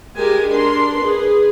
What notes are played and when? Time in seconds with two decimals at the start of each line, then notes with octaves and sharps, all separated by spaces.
0.17 G#3 G4 A#4 G#5
0.49 D4 A#4 C6
0.97 G#4 B4